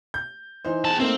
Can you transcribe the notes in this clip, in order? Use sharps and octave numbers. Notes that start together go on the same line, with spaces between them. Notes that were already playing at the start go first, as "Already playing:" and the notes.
G6
E3 D#4 C5
E2 A5
A3 A#3 C4 D#4